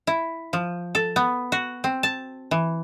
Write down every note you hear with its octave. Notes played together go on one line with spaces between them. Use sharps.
E4
F3
A4
B3
F#4
C4
A5
E3